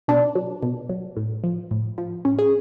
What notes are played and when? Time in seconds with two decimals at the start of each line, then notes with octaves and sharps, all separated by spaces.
0.08 B2 D4
0.35 F#3
0.63 B2
0.89 F#3
1.17 A2
1.44 F3
1.71 A2
1.98 F3
2.25 A2 C#4
2.39 G#4